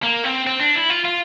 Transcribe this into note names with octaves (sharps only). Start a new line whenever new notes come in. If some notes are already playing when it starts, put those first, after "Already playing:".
A#3
C4
C4
D4
E4
F4
F4